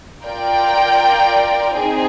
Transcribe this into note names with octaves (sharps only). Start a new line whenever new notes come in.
F4 A#4 D5 G5
C4 D#4 G#4